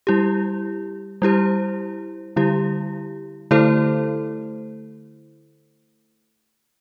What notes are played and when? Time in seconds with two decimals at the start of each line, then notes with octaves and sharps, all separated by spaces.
0.07 G3 E4 G4
1.22 G3 E4 G4 C5
2.36 D3 G3 E4 G4
3.51 D3 A3 E4 A4 C5